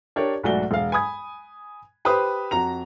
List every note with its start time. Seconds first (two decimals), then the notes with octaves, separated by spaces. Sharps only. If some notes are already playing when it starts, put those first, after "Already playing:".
0.16 D4 G4 A#4 C#5 D5
0.43 B1 G#2 A3 F#4 D5 G7
0.71 E1 F5
0.92 G#5 B5 D#6 G#6
2.05 G4 B4 C5 B5 D#6
2.51 F2 F#4 A#5 F7